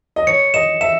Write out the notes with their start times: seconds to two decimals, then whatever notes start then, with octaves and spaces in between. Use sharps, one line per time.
0.16 D#5
0.27 C#5 C#7
0.54 D#5 E7
0.81 E5 E7